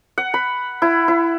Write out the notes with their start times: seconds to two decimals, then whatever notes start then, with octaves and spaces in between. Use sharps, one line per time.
0.18 F#5
0.34 B5
0.82 E4
1.08 E4